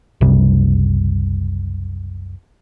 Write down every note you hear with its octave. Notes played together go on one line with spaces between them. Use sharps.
F#1 C2 C3 G3